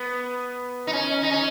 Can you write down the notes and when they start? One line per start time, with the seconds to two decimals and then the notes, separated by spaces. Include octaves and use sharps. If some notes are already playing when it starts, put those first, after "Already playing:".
Already playing: B3
0.87 D#4
0.93 C#4
1.23 D#4
1.31 C#4